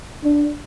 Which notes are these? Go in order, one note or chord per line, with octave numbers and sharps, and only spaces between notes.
D4